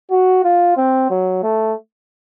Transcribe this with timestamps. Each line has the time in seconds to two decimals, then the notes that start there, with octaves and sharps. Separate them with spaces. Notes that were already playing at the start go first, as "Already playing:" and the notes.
0.11 F#4
0.44 F4
0.77 C4
1.10 F#3
1.43 A3